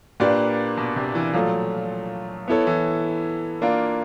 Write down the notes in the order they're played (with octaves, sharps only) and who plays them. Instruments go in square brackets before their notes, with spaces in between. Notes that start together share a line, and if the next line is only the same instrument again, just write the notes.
[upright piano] A#2 [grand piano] A#3 D4 G4 B4 D5
[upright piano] B2
C3
E3
[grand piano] A#2 F#3 A3 [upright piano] F3
[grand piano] B3 E4 A4 C#5
[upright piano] E3
[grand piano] A#3 D4 F4